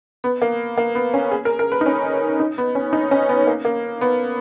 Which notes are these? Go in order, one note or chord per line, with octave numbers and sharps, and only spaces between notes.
B3
A#3
A#3
B3
C#4
G#4
A#4
A#4
B4
D#4
C#4
D#4
B3
C#4
D#4
C#4
B3
A#3
A#3
B3